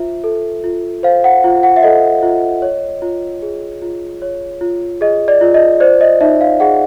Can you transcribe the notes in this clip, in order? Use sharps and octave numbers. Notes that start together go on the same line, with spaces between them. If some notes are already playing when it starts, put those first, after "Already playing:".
Already playing: F4 C5 E5
A4
F4
C5 F5
F#5
F4
F#5
E5
A4 D#5
F4
C#5
F4
G#4
F4
C#5
F4
G#4 D#5
D5
F4
D#5
C5 D5
D#5
D#4 E5
F5
G#4 F#5